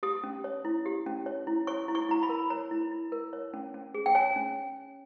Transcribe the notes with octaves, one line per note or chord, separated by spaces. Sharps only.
G4 D#6
C#4
C#5
E4
G4
C#4
C#5
E4
C#5 C#6
E4
C#6
E4 A#5
B5
A#4
C#5 A#5
E4
E4
A#4
C#5
C#4
C#4
G#4
G5
C#5 G#5
C#4